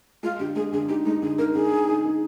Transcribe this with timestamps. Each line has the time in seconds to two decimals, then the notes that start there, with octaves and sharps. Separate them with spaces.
0.23 G#3 F4
0.39 D3 G4
0.55 G#3 G#4
0.73 D3 G#4
0.89 D#4 G4
1.05 G#3 D#4
1.22 D3 G#4
1.38 D#4 A#4
1.55 D3 G#4
1.71 D#4
1.88 D#4
2.04 D#4